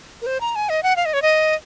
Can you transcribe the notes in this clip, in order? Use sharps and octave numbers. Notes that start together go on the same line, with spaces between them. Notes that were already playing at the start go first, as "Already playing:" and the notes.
A#4
C5
A#5
G#5
D#5
F#5
F5
D#5
C#5
D#5